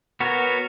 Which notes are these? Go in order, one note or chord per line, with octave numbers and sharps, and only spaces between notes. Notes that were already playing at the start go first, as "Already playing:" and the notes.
B3 F#4 A#4 C#5